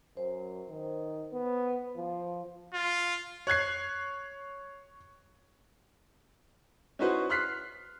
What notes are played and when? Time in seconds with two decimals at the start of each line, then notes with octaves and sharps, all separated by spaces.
0.17 F#2 C5
0.69 D#3
1.33 B3
1.97 F3
2.74 F4
3.47 C#5 F#6 G#6 C7
6.99 C#4 D#4 E4 F#4 B4 C5
7.29 C6 F6 F#6 B6 C7